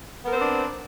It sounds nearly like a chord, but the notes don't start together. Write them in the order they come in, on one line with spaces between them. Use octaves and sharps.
B3 A#4 C5 C4 D4